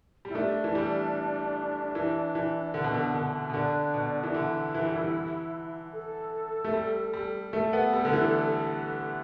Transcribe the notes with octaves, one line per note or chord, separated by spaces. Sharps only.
G3 E4
A3 D4
E3
G3
E3
E3
D3
B2
D3
D3
B2
D3 D4
B2
E3
D3 E4
E3
G3
E3
A4
A3
G3
G3
A3 A4
B3
G3
D3
E3